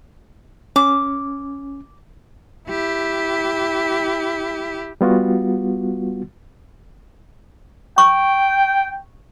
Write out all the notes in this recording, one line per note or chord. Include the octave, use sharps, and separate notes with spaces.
C#4 D6
E4 G4
G3 B3 F4 F#4
G5 C#6